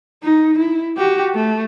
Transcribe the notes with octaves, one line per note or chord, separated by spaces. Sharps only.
D#4
E4
F#4 G4
A3